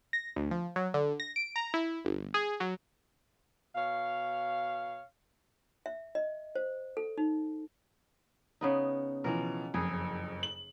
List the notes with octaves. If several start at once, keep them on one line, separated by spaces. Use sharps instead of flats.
A#6
D2
F3
F#3
D3
A#6
D7
A#5
E4
G1
G#4
F#3
B2 C#5 F5
E5
D#5
C5
A4
D#4
C#3 B3 D#4
B2 E3 F3 A#4
F#1 F2 G#4
F#7